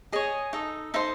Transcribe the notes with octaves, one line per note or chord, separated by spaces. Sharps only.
G#4 C#5 D#5
D#4 A4 D#5
D#4 A4 C5 D#5 E5